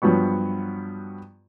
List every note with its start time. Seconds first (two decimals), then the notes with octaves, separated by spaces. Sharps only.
0.02 G2 F3 F#3 B3 C#6